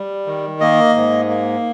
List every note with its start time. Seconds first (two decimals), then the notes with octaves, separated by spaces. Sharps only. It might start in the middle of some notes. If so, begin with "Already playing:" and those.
Already playing: G3
0.27 D#3
0.60 A#3 D#5
0.95 G#2
1.29 A#3